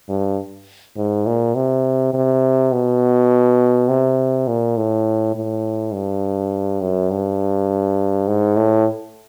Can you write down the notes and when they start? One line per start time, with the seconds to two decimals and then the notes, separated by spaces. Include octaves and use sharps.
0.09 G2
0.97 G#2
1.27 A#2
1.55 C3
2.13 C3
2.72 B2
3.89 C3
4.48 A#2
4.77 A2
5.36 A2
5.94 G2
6.81 F#2
7.11 G2
8.28 G#2
8.56 A2